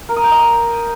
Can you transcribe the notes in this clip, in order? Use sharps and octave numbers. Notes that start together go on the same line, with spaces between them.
A#4
D#6
G5
D#5
D#6